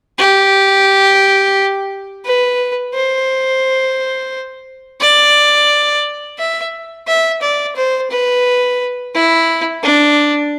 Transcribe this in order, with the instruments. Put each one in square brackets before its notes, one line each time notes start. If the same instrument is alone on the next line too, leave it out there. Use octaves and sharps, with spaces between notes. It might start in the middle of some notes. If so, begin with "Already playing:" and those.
[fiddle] G4
B4
C5
D5
E5
E5
D5
C5
B4
E4
D4